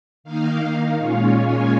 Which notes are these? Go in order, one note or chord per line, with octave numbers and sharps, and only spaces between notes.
D#3 A#3 D#4 F5
A#2 G#3 C#4 F4 C#5
G#5